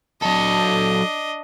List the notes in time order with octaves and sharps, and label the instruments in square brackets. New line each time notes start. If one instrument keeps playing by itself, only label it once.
[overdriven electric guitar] F#3 A4 [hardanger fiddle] D4 D#5